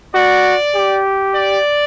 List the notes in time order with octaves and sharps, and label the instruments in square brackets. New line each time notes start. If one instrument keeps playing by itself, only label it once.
[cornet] F#4 [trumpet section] D5
[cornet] G4
[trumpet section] D5